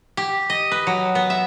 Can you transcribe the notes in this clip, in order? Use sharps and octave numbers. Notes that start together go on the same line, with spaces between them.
G4
D#5
B4
F#3
B3
E5